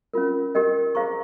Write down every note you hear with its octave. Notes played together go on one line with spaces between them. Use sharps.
C#4 F4 A#4
G4 A#4 D#5 G5
G#4 C5 F5 A#5 C#6